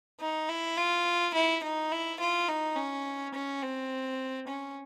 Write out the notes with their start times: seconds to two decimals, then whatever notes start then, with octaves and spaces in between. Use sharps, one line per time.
0.21 D#4
0.49 E4
0.78 F4
1.34 E4
1.63 D#4
1.92 E4
2.20 F4
2.48 D#4
2.76 C#4
3.34 C#4
3.63 C4
4.48 C#4